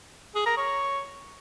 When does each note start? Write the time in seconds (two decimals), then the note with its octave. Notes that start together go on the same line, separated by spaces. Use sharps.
0.35 G#4
0.46 A#4
0.57 C#5